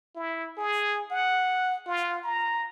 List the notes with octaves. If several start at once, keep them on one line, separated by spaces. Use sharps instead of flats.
E4
G#4
F#5
F4
A#5